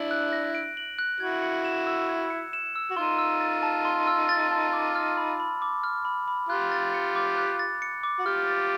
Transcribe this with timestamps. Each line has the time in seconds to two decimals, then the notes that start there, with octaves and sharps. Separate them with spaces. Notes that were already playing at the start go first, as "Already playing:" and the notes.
Already playing: D4 E4 F#7
0.11 F#6
0.32 A#6
0.55 D7
0.77 F#7
0.99 F#6
1.20 E4 F#4 G#6
1.43 C#7
1.65 E7
1.87 E6
2.09 G#6
2.30 C#7
2.53 E7
2.76 E6
2.90 F#4
2.97 D#4 F4 C6
3.18 E6
3.41 A6
3.63 A5
3.85 C6
4.07 E6
4.29 A6
4.51 A5
4.73 D6
4.95 F6
5.17 B5
5.40 B5
5.62 D6
5.84 F6
6.05 B5
6.28 B5
6.49 F4 G4 F#6
6.72 A6
6.94 C#7
7.16 D6
7.37 F#6
7.59 A6
7.82 C#7
8.03 D6
8.19 F#4
8.26 F4 G4 F6
8.48 A6